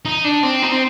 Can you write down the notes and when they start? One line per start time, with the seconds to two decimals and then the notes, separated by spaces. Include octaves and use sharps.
0.05 D#4
0.24 D4
0.43 C4
0.62 D#4
0.72 C4